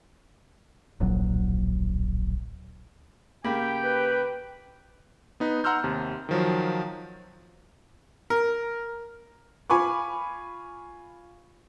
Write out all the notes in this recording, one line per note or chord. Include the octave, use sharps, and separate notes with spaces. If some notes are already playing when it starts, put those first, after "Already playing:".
D1 A#1 F#3
C#3 A#3 G4 G5 B5
B4
B3 D#4 B4
F#5 A#5 C6 E6 F6 G6
D#2 C3
D#3 F3 F#3
A#4
F4 G#5 B5 C#6 D6